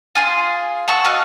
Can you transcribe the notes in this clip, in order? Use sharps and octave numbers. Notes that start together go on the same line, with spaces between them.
F4 G#4 C6
F#5 A5 C#6 E6
F#4 D#5 F5